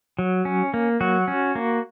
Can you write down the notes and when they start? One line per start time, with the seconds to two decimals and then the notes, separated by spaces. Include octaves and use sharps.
0.19 F#3
0.45 C#4
0.74 A#3
1.01 F#3 F#4
1.28 C#4
1.55 A#3